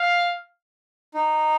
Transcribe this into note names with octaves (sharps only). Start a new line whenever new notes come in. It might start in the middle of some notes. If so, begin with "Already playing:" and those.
Already playing: F5
D#4